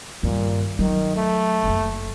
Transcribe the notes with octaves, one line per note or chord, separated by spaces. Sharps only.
G2 A#2 D#3
D#3 F#3
A3
F#1 F#2